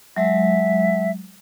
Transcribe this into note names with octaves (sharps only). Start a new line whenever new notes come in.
F#3 G#3 E5